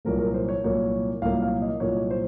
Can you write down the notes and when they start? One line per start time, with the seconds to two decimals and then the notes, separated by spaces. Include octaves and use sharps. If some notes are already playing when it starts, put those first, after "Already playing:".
0.05 C2 A#2 F#3 A#3 A#4
0.19 A#4
0.34 C5
0.49 C#5
0.64 C2 A#2 F#3 A#3 C#5
1.22 C2 A#2 F#3 A#3 F5
1.42 F5
1.62 D#5
1.80 C2 A#2 F#3 A#3 C#5
2.10 C5